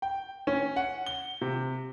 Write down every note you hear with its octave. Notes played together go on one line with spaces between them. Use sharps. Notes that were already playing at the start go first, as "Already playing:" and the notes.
G5
C#4
F#5
G7
C3